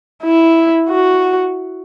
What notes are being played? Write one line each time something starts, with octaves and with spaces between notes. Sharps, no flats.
E4
F#4